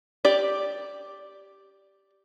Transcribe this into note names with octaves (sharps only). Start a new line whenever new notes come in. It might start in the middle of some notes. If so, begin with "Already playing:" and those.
G4 D5